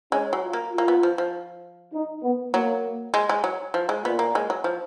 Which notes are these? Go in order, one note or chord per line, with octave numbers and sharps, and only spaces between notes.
G#3 C#4
F#3
F4
A#3
F4
A#3
B3
F3
F3
D#4
B3
F#3 A#3
G#3
G#3
F#3
F3
G#3
A#2 B3
A#3
G#3
F#3
F3